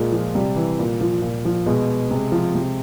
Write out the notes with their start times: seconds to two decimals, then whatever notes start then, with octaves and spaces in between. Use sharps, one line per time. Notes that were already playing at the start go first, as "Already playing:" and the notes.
Already playing: A#2 G#3
0.12 F3
0.35 C3 G3
0.56 E3
0.79 A#2
1.01 F3
1.22 A#2
1.45 F3
1.66 B2 G#3
2.11 C3 G#3
2.32 F3
2.55 C3